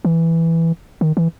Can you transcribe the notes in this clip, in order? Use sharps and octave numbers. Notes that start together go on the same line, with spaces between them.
E3
D#3
E3